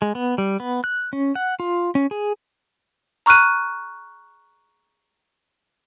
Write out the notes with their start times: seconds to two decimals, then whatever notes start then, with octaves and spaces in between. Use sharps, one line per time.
0.02 G#3
0.15 B3
0.38 G3
0.60 B3
0.84 F#6
1.13 C#4
1.35 F#5
1.60 F4
1.95 C#4
2.11 G#4
3.26 A#5 C#6 F6 F#6 D#7